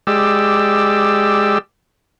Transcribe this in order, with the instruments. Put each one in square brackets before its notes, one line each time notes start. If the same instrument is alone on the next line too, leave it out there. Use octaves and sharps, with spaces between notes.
[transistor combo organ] G#3 G4 D5 E6